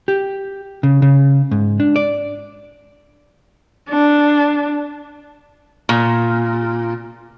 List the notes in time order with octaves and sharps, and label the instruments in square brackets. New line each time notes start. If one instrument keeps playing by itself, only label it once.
[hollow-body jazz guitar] G4
C#3
C#3
G#2
D4
D5
[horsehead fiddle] D4
[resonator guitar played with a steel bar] A#2